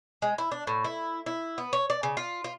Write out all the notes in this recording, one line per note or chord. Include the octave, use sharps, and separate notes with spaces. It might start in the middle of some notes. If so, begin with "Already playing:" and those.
G#3
E4
D4
A2
E4
E4
B3
C#5
D5
C#3
F4
F4